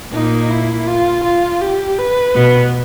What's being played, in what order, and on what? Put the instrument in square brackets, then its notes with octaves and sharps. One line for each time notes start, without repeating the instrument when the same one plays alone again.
[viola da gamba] A#2 A#3 [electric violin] D#4
[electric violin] E4
F4
F4
G4
B4
[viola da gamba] B2 B3